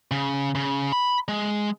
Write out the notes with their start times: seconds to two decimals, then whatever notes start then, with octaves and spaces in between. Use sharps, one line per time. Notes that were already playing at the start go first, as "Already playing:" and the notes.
0.11 C#3
0.55 C#3
0.92 B5
1.28 G#3